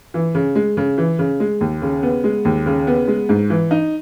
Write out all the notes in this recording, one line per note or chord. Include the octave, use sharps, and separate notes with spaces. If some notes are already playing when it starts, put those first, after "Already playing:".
E3
C#3
G#3
C#3
E3
C#3
G#3
D#2
C#3
B3
G#3
D#2
C#3
B3
G#3
G#2
E3
D#4